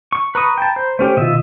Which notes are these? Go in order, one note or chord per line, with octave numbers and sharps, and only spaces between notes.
C#6
B4 A#5 B5 C#6 D#6
G5 A5
C5
A3 C#4 G4 C5
B2 D#3 F4 D#5 E5